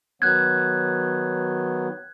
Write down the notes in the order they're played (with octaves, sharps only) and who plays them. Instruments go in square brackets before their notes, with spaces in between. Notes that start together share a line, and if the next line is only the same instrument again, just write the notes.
[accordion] D#3 F#3 B3 [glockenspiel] F#6 G#6